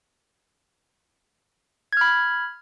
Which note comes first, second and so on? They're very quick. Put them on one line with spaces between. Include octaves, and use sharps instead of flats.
G#6 F6 B5